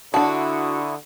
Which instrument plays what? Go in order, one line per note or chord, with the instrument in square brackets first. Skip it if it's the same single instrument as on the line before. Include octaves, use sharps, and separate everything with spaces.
[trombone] D3 [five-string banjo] D4 A5 [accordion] E4 C#6 D#6 [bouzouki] F#4